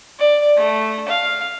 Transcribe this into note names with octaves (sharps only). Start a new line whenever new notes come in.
D5
A3
F5